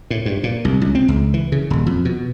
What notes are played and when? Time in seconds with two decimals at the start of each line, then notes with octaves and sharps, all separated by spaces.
0.10 A2
0.26 G2
0.43 A#2
0.65 C2
0.82 C#2
0.95 C4
1.08 C#2
1.34 E3
1.52 C#3
1.70 D#1
1.87 F2
2.05 B2